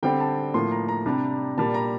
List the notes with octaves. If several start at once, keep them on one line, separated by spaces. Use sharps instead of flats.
D3 G3 C4 G5
A5
A2 F3 A#3 C6
A#5
A#5
C3 G3 D4
A#2 G3 A#3 A5
A#5